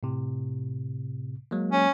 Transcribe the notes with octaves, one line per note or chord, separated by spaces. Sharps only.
A2 C3
F#3 G#3 A#3
C#4